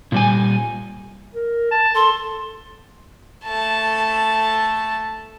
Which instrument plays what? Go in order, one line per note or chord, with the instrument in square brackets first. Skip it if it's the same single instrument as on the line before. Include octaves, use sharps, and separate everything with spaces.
[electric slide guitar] A#2 G3 G#5
[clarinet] A#4
A5
[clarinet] A4 [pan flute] C6
[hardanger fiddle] A3 A5